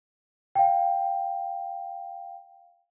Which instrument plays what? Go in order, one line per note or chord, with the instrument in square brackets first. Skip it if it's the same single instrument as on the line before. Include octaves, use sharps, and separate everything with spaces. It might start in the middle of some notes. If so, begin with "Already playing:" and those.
[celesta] F5 G5